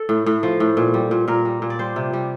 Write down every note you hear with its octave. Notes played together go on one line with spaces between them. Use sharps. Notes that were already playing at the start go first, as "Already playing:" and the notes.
Already playing: A4
A2
A2
F3
A2
A#2
G3
A#2
A#2 A#4
G3
A#2
D5
G3 C5
C3
G3